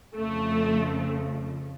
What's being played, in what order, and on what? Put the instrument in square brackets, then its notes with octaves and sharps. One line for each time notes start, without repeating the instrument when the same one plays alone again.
[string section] F2 C#3 F3 A3